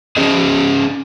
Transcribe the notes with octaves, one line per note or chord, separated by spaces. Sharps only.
C#4 G#4 C5 D#5